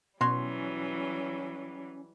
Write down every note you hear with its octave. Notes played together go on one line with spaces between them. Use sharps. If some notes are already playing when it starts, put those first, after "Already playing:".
B2 E3 F#3 G3 C#4 F#4 C#5 C6